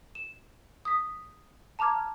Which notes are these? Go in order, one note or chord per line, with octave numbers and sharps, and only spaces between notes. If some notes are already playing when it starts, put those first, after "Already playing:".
E7
D#6 B6
A5 A#5 D6 F6 G#6